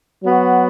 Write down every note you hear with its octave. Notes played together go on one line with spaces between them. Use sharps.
F#3 B3 F#4